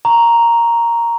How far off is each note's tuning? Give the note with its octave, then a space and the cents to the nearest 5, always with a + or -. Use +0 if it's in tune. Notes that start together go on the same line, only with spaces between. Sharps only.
A#5 +0 C#6 +0